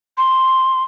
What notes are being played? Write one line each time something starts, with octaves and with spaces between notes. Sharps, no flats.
C6